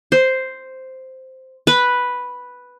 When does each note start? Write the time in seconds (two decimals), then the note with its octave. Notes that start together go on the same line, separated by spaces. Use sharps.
0.12 C5
1.67 B4